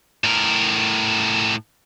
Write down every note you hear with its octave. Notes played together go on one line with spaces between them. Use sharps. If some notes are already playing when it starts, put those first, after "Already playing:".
A2 A#4